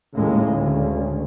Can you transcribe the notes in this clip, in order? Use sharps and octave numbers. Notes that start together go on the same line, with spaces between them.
D#2 A2 C#3 G#3
D2